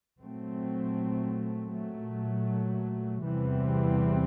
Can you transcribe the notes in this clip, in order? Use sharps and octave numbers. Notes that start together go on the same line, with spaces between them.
A#2 F#3 A3 C4
A#2 F#3 A3
E2 C3 E3 G3 C4